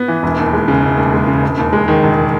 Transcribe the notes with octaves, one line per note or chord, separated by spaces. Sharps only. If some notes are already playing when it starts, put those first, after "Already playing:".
Already playing: B3
E3
E1
D#2
G#3
C#3
E1
D#2
G#3
C#3
E1
D#2
G#3
D#3
E1